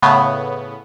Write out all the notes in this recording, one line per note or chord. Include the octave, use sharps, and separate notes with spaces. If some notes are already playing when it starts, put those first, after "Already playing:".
A2 C#3 B3